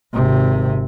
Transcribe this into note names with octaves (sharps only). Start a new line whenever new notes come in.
G#1 C3